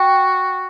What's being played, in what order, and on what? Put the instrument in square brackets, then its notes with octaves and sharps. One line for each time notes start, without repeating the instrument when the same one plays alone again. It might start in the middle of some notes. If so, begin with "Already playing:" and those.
Already playing: [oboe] F#4 [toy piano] G5